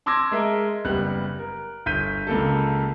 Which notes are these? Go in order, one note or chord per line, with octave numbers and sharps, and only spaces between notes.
A5 C6 D6 E6 G#6 A#6
G#3 A#4 E5
F#1 G3 B3 F#6
A#4
G1 G6 B6 D#7
C#2 A#3 A4